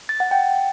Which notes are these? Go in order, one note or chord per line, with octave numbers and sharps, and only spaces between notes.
A6
F#5
G5